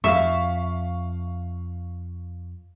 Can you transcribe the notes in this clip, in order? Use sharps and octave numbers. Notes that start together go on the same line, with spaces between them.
F2 E5 F5 C#6